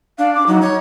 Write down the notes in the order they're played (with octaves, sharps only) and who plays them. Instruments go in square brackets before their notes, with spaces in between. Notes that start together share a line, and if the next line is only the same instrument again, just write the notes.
[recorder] D4 [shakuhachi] F5
[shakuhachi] D6
[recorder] F#3 [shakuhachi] D#4
[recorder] C#5